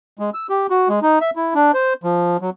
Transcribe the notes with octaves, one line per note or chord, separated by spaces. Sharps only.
G#3
E6
G4
F#4
G#3
D#4
E5
E4
D4
C5
F3
F#3